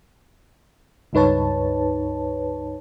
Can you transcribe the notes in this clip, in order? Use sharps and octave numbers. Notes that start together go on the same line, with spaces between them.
C#2 G2 D#4 B4 C#5 A5